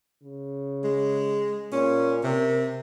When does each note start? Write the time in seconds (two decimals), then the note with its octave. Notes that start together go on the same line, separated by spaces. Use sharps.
0.23 C#3
0.84 G#3
1.72 A#2 C#4
2.24 C3 A#4